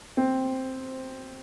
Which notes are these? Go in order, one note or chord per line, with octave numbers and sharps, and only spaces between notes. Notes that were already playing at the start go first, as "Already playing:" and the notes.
C4